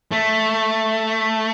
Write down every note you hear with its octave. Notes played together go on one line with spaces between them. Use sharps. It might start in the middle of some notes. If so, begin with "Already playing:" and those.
A3